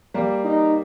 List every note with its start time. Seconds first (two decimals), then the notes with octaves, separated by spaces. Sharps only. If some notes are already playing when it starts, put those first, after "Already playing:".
0.14 G3 A#3
0.44 D#4